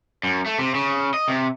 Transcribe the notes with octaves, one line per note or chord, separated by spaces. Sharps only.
F#2
A3
C3
C#3
D#5
C3